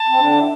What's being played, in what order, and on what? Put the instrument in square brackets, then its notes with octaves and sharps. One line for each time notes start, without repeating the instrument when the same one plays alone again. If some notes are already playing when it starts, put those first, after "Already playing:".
Already playing: [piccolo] A5
[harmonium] C4
D3 D4
E4